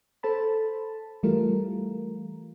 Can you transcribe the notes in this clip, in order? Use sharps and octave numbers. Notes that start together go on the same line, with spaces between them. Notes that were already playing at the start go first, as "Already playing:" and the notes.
A4 C5 A5 B5
E3 G3 A3 F4 A#4